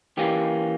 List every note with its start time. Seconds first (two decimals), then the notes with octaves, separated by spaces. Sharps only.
0.17 E3 A#3 C#4 G4